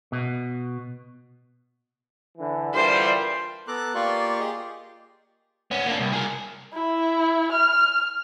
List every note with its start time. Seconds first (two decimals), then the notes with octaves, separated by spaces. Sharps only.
0.12 B2
2.38 D3 E3
2.73 D3 E3 G3 F4 A#4 C5
3.68 B3 A4 A#5 D6 F#6
3.95 A#3 F4 G4 D5 C6 C#6
4.40 G4 G#4 D#5
5.71 B3 C#4
5.87 A#3 D4
6.00 C2
6.13 G#4 A#4
6.73 E4
7.52 F6